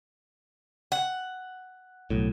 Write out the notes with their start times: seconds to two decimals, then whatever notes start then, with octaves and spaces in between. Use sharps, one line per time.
0.92 F#5
2.10 B1 A2